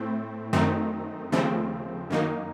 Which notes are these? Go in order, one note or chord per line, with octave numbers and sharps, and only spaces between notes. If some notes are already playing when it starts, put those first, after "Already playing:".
Already playing: A2 A3 C4
F#2 D#3 A3 C4 D#4
D#2 C#3 F3 A3 C4
F#2 D#3 A#3 D#4